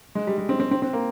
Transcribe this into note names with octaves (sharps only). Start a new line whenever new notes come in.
G#3
G3
G#3
C4
C4
C4
C4
A#3